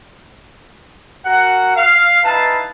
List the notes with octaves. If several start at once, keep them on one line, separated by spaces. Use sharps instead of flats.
F#4 A#4 F#5
F5
D#4 E4 B4 F5 A5